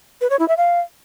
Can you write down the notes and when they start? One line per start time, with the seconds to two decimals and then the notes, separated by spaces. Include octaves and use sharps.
0.21 B4
0.30 C#5
0.39 E4
0.48 E5
0.57 F5